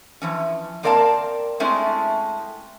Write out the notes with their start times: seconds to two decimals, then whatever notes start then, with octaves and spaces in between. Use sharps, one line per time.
0.22 E3 F3 C#4
0.83 A#3 C4 A#4 D5 F5 A5
1.60 G#3 A3 C4 C#4 E4